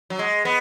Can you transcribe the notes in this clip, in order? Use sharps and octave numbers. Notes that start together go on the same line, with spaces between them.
F#3
G#3
B3